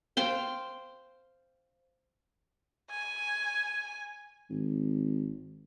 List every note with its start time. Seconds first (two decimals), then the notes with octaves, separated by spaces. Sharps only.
0.17 C5 F5 G5
2.91 G#5
4.50 G#1